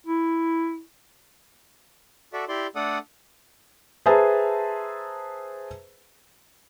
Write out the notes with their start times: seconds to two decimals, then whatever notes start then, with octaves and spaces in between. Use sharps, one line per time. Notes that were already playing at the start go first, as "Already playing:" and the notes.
0.06 E4
2.33 F#4 A4 D5 E5
2.48 E4 G4 D5 C6
2.75 A3 D4 A4 D5 F#5 D#6
4.06 G#4 B4 C5 E5 A5 A#5